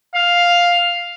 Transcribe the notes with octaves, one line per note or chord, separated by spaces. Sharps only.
F5